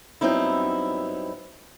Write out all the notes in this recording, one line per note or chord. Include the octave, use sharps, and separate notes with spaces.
G2 F#3 B3 C4 D#4 E4